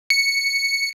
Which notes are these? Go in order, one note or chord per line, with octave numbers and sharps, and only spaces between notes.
C#7